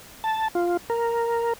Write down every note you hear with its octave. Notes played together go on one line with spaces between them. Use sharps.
A5
F4
A#4